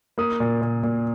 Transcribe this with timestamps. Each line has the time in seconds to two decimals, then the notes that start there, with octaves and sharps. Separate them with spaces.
0.18 A#3 D#6
0.40 A#2
0.62 A#2
0.83 A#2